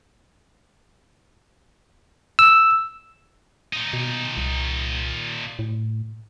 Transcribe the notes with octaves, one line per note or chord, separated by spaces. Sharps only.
E6
A#2 D#4
B2
C2
A2